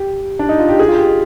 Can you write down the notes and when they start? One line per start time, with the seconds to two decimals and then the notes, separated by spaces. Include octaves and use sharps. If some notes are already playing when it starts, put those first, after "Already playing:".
Already playing: G4
0.39 D4
0.49 D#4
0.59 F4
0.69 G4
0.79 G#4
0.88 F4
0.97 G4